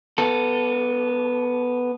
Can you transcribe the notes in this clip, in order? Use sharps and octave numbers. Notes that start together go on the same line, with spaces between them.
B3 A4